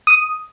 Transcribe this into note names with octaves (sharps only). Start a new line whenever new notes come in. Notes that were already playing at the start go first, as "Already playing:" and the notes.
D#6